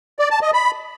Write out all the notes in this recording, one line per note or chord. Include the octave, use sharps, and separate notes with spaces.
D5
A5
D#5
B5